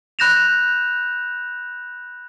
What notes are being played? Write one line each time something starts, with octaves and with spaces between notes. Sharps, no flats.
B5 F#6 G6 A#6 E7 F7